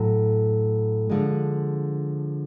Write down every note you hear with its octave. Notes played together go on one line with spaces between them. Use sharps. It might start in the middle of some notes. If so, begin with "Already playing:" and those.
Already playing: A2 F#3 A3
D3 F3 G#3